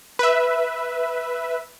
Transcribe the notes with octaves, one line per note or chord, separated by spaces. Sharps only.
B4 E5